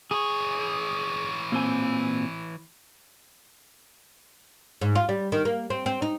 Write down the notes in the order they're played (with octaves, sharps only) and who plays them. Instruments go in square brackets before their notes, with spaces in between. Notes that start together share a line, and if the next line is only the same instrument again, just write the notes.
[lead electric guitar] E3 C#5 [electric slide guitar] G#4
[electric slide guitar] A#2 C4 G#5
[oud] G#2
F4
G3
D#3
A#3
C4
C4
D#4